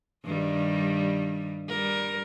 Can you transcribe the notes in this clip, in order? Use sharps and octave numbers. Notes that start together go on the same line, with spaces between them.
G2 D#3 G3
G3 A#4